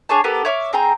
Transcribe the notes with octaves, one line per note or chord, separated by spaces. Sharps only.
D4 G#4 C#5 A5
B3 G4 A4 A#4
C#5 E5 D6 F6
C4 G#4 G5 A#5